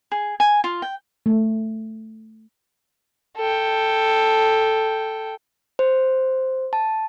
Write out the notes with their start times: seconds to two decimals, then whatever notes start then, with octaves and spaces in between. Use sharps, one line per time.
0.12 G#4
0.40 G#5
0.64 F4
0.82 G5
1.26 A3
3.37 A4 G5
5.79 C5
6.73 A5